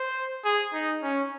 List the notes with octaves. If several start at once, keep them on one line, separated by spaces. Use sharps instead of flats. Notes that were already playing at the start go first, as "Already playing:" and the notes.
Already playing: C5
G#4
D#4
C#4